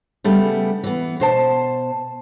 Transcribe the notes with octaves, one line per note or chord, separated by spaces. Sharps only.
C#3 G3 A3 B3
E3 B3
B2 C5 A5